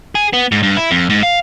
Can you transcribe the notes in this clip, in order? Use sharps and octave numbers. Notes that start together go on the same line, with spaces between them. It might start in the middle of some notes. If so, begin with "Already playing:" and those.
G#4
B3
G#2
G2
E4
F2
G#2
F5